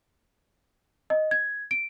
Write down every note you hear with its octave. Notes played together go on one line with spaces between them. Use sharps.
D#5
G#6
D7